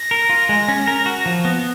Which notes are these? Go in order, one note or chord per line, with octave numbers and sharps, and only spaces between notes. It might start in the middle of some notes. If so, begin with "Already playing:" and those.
Already playing: A#6
A#4
F4
G#3
C#4
A#4
F#4
F3
B3